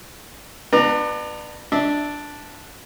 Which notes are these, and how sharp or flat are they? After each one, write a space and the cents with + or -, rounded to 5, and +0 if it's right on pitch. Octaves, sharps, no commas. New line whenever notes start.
B3 +0 D4 +35 A#5 +0
D4 +0 E5 -25